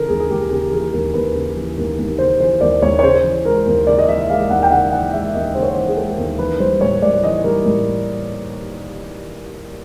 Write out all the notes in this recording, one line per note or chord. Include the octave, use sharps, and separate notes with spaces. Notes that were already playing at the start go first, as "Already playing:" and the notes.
Already playing: C#3 E3 A4 A#4
D#2 G#4
G#4
D#2 G4
C#3 G4
E3 G#4
D#2 A#4
D#2 B4
C#3
E3
D#2
D#2
C#3 C5
E3 C5
D#2 D5
D#2 C#5
C#5
C#3 C5
E3
G#3 A#4
D#2
C#3 D5
D#5
E3 E5
G#3 F5
D#2 F#5
G5
C#3 F#5
E3 F#5
G#3 E5
D#2 D#5
C#3 C5
C#5
C5
E3
G#4
G#3 A4
D#2
E3 B4
G3 C5
A2 C#5
A2 D5
E3 D#5
G3 A#4
A2